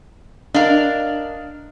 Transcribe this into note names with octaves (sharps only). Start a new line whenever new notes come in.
D4 A#4 D#5 F5